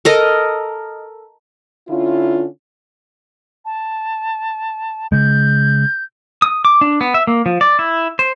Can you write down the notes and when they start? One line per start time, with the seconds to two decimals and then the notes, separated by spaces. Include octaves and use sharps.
0.05 A4 A#4 D#5
1.89 D3 C#4 E4 F4
3.65 A5
5.12 C#3 G#3 G6
6.42 D#6
6.65 D6
6.81 D4
7.01 B3
7.14 E5
7.27 A#3
7.46 F3
7.61 D5
7.79 E4
8.19 C5